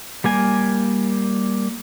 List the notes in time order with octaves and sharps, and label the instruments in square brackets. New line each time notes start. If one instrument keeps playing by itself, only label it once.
[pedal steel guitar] G3 A#3 G#5